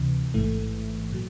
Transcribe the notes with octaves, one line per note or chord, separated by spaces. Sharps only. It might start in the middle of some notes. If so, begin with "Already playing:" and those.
Already playing: D2 C3 E3
A1 G#2 E3 A3
A#2 F#3